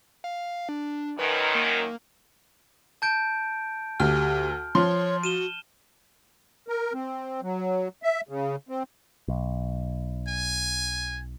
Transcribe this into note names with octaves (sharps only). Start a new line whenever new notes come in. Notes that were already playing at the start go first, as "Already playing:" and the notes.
F5
D4
F#2 D#3 B4
A#3
A5 G6 D7
D2 G4 F6
F3 C#5 C6
F#4 D#7 E7 G7
A#4
C4
F#3
E5
C#3
C4
B1
G#5